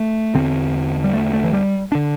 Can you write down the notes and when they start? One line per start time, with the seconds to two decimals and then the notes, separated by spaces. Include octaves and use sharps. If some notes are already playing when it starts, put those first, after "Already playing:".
Already playing: A3
0.35 E2 D3 C4
1.04 G3
1.13 A3
1.33 A3
1.44 E3
1.53 G3
1.92 D3 D4